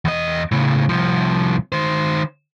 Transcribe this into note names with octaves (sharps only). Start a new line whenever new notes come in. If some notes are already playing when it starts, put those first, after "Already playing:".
E2 D#5
A2 C#3
C2 F3
D#3 C5